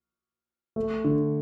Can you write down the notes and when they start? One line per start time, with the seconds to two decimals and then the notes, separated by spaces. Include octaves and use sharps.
0.76 A3
1.04 D3